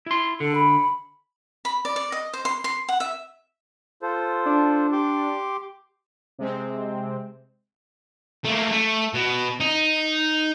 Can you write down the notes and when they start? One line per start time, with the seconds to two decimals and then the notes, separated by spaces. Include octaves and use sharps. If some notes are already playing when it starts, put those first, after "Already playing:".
0.06 E4 C6
0.40 D3 A4
0.55 B5
1.65 B5
1.85 D5
1.96 D5
2.12 D#5
2.33 C5
2.45 C6
2.64 C6
2.88 F#5
3.00 E5
4.03 F4 A4 C5
4.46 D4
4.92 G4 C6 D6
6.39 C3 G#3 C4
8.45 A3 A#3
8.71 A3
9.14 B2
9.60 D#4